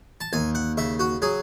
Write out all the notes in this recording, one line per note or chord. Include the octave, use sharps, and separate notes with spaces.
A5
D#2 G#5
F#5
C#3 E5
F#4
F#3 G#4